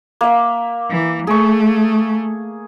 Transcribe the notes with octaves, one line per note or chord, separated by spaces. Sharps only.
A#3 E5
E3
A3 G#4 C#6